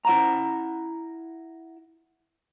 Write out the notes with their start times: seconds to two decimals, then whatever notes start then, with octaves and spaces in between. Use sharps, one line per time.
0.05 E4 F#5 A#5